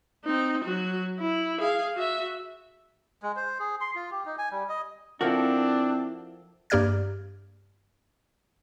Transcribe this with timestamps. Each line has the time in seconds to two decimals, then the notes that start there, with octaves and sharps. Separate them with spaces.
0.25 C4 D#4
0.64 F#3 F#4
1.19 E4
1.59 G#4 F5
1.95 F#4 E5
3.23 G#3
3.36 C5
3.59 G#4
3.81 C6
3.95 F4
4.11 G4
4.26 D#4
4.38 G#5
4.52 G3
4.69 D#5
5.21 F3 C4 D4 E4 F#4 A4 A#4
6.70 G2 A#3 G4 D5 F6 G#6